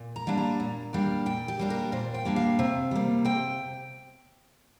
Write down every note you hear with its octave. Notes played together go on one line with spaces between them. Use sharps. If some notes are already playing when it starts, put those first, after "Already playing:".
Already playing: A#2
A#5
G3 A#3 D4
A#5
A#2
G3 A#3 D4
A#2 G5
G4
G3 A#3 D4
A#4
A#2 C5
G5
G3 A#3 D4
F5
C3
G3 A#3
C3 G5